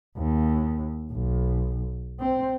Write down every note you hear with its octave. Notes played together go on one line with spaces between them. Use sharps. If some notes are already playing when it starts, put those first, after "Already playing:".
D#2
B1
C4